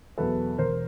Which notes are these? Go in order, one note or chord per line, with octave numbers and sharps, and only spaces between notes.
E2 B2 F#3 A4 B4
E1 A#4 C5